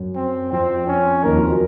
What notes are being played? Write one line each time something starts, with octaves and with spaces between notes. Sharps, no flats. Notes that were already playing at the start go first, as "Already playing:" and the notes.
Already playing: F#2 F#3
C4
F2 F3 C4
C#4
D#2 D#3 A#4
F2 F3
F#3